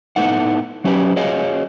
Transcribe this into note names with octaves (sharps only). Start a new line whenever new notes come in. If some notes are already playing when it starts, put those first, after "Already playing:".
A2 A3 B3 D#4 F#5
F#3 C#4 G4 B4
F#4 G#4 C#5 D#5 F5